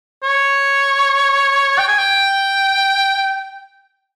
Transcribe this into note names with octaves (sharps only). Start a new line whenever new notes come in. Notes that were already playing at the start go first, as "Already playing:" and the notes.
C#5
G5
G#5
G5